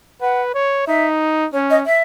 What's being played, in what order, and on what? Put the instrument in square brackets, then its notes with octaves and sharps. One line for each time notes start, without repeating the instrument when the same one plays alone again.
[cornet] B4 [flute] F#5
[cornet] C#5
[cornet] D#4 [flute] E5
[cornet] C#4 [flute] C#5
[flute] D#5
E5